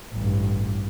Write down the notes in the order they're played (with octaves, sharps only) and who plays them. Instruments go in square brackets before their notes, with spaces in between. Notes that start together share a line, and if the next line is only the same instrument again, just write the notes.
[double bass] A1 G2